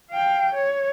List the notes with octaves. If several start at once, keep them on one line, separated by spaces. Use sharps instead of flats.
F5 G5
C#5